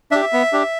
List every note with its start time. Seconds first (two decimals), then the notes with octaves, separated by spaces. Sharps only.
0.11 D4 G4 E5
0.33 B3
0.53 D4 G4